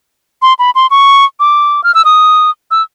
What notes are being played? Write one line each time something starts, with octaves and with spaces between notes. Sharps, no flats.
C6
B5
C6
C#6
D6
F6
E6
D#6
E6